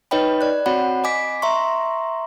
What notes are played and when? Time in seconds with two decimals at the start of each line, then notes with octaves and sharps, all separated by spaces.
0.11 D#4 B4 C#5 D#5 G5 B5
0.41 D5 F#6
0.66 C4 F#4 C#5 F#5 B5
1.04 D#5 G#5 D6 B6
1.42 E5 A#5 C6 C#6